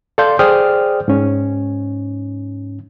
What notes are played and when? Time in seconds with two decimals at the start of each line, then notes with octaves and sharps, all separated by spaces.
0.18 A4 D5 F5 C6 G6
0.39 G#4 C5 D5 G5 D#6 F6
1.08 G#2 C#4